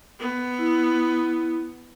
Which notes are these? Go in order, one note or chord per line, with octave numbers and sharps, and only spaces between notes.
B3
E4